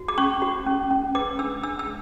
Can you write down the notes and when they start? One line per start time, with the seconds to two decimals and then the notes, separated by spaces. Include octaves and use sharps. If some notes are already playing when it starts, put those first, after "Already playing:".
Already playing: F#4
0.08 D6
0.18 C#4 C#6
0.42 F#4
0.66 C#4
0.91 C#4
1.15 B4 D6
1.39 D4 E6
1.63 D4 E6
1.79 E6